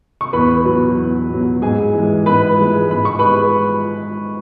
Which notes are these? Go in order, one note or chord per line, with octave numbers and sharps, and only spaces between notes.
C#6
E2 B4 B5
B2 F#3
E2
B2 F#3
G#2 G#4 G#5
E3 G#3
G#2 B4 B5
E3 G#3
G#2 B5
C#6
G#3 B4 B5